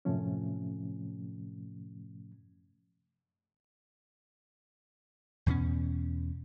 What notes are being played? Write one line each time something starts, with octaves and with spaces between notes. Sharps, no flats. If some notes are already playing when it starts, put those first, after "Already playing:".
F#2 A2 C3 F3 A3 C#4
E2 B2 A3 C#4